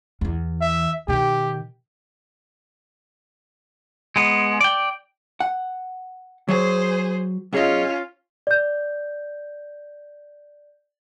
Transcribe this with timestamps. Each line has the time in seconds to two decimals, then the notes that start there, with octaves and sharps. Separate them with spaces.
0.21 E2 E3
0.61 E5
1.08 B2 D#3 G4
4.16 G#3 B3
4.61 D5 G5
5.40 F#5
6.49 F#3 G#4 C5
7.53 B1 C#4 F4 G#4 D#5
8.47 D5 G6